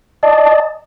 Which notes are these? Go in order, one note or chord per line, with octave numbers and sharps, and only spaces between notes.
D5 D#5 A5